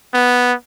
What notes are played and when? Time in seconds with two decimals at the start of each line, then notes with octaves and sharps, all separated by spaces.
0.14 B3